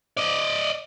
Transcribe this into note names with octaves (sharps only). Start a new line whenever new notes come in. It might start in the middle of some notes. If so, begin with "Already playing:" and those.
D5 D#5